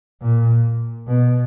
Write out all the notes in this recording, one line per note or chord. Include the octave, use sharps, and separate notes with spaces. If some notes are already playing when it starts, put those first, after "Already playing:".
A#2
B2